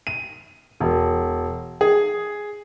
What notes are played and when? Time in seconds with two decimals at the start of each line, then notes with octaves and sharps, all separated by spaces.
0.07 D#7
0.80 E1
1.81 G#4